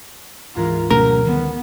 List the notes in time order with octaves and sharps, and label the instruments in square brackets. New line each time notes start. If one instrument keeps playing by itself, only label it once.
[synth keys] D2 G#2 E3 [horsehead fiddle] F4 A#4
[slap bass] B2 A3 C#4 [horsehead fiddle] F#3 [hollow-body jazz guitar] A#4
[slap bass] D3 D#3 G3 [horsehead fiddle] B3